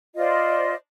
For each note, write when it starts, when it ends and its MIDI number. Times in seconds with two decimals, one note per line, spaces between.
0.16 0.74 65
0.16 0.74 72
0.16 0.74 74
0.16 0.74 75